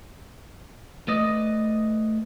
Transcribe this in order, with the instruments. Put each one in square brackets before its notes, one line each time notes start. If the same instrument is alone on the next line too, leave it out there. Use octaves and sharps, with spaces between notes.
[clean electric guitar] A3 B4 D5 D#5